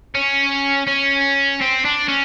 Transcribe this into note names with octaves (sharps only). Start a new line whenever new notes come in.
C#4
C#4
C4
D4
C#4